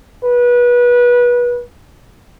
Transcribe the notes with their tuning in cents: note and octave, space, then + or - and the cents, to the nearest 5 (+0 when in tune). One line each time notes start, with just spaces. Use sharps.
B4 -25